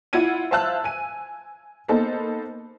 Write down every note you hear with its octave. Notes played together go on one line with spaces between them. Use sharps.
E4 F4 F#5 G#6 D#7
C5 E5 F5 A5 E6 F#6
G#5 D#7
A#3 B3 D#4 A4 C5